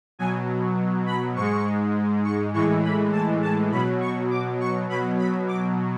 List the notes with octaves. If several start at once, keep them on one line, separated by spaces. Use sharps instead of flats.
B2 F#3 G#5
B5
G#2 G#3 C#6
C#6
A2 E3 G#3 C#6
B5
A5
A5
B2 F#3 B5
C#6
D6
C#6
B2 F#3 B5
B5
D6